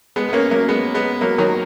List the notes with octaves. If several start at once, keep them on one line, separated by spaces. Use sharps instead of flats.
G#3 B3
B3
A#3 C#4
F#3 A#3
G#3 B3
G#3 B3
F#3 A#3
D#3 F#3